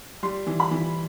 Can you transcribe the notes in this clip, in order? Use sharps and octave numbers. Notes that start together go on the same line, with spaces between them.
G3 C6
E3
B5
E3